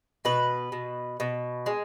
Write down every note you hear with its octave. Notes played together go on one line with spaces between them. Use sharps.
B2 B4
B2
B2
G#3